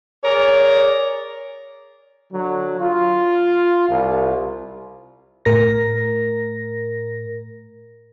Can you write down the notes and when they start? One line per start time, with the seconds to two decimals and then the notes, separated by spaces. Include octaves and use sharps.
0.24 G#4 A#4 C#5 D5
2.32 D3 F#3
2.79 F4
3.88 C2
5.45 A2 A#4 A#6